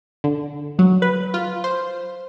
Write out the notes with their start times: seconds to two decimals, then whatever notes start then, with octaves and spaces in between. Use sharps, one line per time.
0.24 D3
0.79 F#3
1.02 B4
1.34 F4
1.64 C5